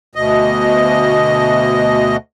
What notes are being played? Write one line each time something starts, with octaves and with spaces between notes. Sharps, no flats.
D2 B2 D#5